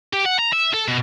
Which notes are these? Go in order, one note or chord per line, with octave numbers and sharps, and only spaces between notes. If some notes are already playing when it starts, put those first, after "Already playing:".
G4
F#5
A#5
E5
A4
B2